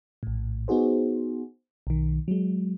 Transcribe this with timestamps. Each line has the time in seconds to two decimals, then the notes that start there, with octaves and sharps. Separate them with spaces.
0.23 A#1 A2
0.68 B3 D#4 F#4 G#4 C5
1.87 B1 D#3
2.28 F#3 G#3